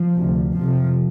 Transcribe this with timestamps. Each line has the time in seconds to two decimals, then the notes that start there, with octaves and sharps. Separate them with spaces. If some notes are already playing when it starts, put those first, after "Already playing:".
Already playing: F3
0.14 D2 C3
0.56 F2 C3 F3